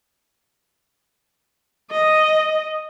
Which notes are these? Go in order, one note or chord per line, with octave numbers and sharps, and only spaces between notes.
D#5